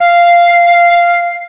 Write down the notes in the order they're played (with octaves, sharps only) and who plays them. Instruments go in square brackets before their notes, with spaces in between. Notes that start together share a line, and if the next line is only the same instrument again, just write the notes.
[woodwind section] F5